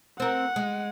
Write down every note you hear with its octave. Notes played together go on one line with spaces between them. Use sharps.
C4 A#4 F#5
G#3